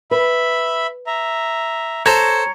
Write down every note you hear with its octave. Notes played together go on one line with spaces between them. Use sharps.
B4 E5 B5
E5 A#5
A4 C5 C#5 A#5